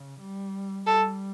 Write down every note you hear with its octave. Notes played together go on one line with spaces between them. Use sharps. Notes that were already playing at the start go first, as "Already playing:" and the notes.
Already playing: C#3
G3
G3 A4